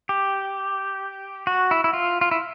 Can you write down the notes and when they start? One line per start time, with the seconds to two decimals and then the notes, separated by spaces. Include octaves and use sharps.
0.09 G4
1.47 F#4
1.71 E4
1.84 E4
1.93 F4
2.21 F4
2.31 E4